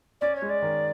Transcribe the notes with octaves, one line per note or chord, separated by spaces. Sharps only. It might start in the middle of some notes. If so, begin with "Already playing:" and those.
C#4 D5
C#5
G#3
D5
D#3